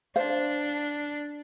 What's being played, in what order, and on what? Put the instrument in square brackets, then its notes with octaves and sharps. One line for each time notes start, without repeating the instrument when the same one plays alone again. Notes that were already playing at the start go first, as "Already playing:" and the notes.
[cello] D4 [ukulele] C5 F5